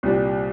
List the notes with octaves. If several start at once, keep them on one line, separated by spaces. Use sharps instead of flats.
C2 A#2 G3